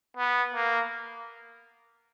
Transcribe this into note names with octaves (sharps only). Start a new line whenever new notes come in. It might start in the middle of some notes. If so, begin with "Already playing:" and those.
B3
A#3